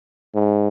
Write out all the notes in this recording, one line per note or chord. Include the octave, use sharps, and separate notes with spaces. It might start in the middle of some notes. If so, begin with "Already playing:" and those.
G#2